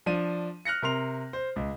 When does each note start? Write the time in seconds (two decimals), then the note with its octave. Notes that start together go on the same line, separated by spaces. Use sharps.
0.06 F3 D4 D#7
0.65 F6 F#6 A#6 C#7
0.82 C3 A#4 C6 F7
1.33 C5
1.56 C#2